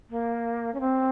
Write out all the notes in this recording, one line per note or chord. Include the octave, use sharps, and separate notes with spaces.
A#3
C#4
C4